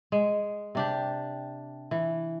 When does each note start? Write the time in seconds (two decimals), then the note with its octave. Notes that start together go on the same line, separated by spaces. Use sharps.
0.12 G#3
0.75 C3 D4 G4
1.91 E3